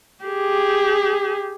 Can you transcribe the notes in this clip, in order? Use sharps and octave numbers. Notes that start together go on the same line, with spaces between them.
G4 G#4